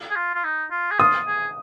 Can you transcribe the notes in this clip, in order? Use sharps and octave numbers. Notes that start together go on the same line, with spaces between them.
G#4
F4
F4
D#4
F4
G#4
F4 D#6
G#4